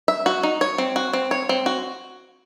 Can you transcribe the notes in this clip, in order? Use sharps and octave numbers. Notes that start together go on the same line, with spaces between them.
E5
F#4
D#4
C#5
C4
F#4
C4
C#5
C4
F#4